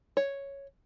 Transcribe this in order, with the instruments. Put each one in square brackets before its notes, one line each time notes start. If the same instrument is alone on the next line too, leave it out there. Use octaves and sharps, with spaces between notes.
[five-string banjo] C#5